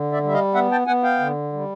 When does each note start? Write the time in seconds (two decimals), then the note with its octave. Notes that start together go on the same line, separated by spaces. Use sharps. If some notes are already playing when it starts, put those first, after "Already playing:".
Already playing: D3
0.12 D5 E5
0.23 G3 E5
0.33 D#5 F5
0.54 B3 E5 F#5
0.72 G5 A5
0.87 B3 F#5 G#5
1.03 F5 G5
1.19 D3
1.53 G3